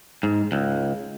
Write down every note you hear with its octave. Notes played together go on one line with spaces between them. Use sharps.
G#2
C#2